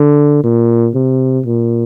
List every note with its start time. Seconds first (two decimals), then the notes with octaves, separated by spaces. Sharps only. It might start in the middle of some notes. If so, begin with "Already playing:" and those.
Already playing: D3
0.43 A#2
0.95 C3
1.45 A#2